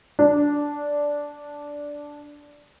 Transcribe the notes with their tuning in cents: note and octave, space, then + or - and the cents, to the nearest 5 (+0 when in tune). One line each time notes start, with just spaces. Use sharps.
D4 -5